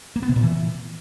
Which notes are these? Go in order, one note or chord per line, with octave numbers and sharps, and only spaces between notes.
A#3
B3
C3
A#2
E3